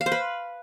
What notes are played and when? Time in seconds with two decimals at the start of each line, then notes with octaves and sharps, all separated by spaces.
0.01 F5
0.06 C5
0.12 B4